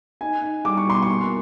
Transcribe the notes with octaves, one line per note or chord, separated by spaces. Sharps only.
D#4 G#5
D#4
G3 D6
C#6
B2 C6
C#6
A#3